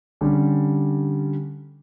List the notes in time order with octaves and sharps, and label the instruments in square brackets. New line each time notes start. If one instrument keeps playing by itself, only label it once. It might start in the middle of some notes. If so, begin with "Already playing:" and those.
[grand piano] D3 G3 C#4 G4